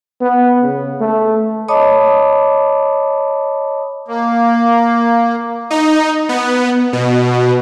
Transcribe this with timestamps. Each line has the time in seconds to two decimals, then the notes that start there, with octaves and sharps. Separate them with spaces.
0.21 B3
0.62 C#3
1.00 A3
1.68 C#5 D#5 A5 B5 D6 D#6
4.08 A#3
5.70 D#4
6.29 B3
6.93 B2